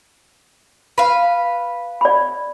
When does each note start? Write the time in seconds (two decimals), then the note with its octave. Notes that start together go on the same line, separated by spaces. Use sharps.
0.98 B4 F5
2.01 D5 B5